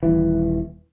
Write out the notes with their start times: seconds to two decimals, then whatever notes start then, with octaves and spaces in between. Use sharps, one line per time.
0.03 D#1 E3